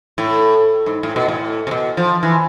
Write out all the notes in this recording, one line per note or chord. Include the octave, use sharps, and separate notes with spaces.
A2
G#2
A2
B2
A2
C3
B2
F3
E3